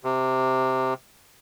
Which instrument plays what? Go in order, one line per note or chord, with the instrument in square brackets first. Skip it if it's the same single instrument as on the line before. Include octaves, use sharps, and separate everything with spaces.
[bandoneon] C3